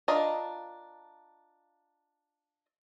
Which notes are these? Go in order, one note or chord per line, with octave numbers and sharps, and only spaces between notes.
D4 F4 A#4 D#5